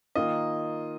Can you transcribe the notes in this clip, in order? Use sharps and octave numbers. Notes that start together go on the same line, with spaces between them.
D#3 A#3 F4 D#5